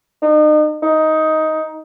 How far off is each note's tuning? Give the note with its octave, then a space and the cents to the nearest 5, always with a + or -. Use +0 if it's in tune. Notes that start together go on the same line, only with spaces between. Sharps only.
D#4 -40
D#4 +10